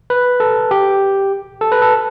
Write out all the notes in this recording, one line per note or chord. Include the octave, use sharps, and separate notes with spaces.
B4
A4
G4
A4
B4
A4